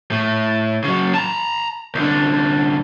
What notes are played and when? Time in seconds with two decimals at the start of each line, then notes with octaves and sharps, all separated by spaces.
0.11 A2
0.84 C#3 F#3
1.14 A5 A#5
1.95 C2 D3